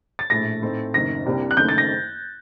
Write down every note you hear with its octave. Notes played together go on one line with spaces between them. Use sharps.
A6
A#1 A2 A3 A#6
A2 A3 C4 D#4
F#1 F#2 D#3 A#6
C2 C3 G3 A#3 D4
F#6
F#1 F#2 D#3 A3 G6
A6
A#6